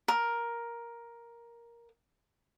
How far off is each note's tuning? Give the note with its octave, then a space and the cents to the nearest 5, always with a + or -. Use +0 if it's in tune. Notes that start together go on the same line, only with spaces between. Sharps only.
A#4 +10